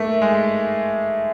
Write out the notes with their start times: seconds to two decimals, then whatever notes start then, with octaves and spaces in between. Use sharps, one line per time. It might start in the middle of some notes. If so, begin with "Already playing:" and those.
Already playing: A3 A#3
0.22 G#3